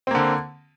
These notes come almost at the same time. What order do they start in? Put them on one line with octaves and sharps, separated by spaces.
C4 A#3 D3